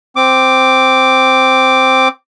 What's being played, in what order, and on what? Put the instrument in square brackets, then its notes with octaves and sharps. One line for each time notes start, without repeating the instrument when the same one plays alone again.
[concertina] C4 D6